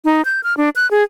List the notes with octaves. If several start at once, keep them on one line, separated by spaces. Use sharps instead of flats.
D#4
G6
F6
D4
F#6
G#4